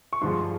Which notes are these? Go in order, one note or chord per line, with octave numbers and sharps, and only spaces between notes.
C#6
G2 D3 F3 G#3 C6